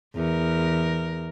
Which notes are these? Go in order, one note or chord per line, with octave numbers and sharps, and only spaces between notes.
E2 A#4